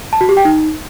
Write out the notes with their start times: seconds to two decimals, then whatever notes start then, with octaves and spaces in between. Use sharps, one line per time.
0.13 A5
0.21 F#4
0.29 G4
0.37 G5
0.45 D#4